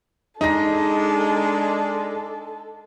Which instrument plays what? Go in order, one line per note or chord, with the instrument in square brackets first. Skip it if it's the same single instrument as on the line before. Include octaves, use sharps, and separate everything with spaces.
[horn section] G#3 D4 [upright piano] D#4 A#6 [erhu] A4